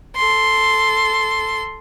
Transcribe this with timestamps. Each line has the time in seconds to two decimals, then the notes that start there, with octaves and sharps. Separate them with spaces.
0.16 A4 C6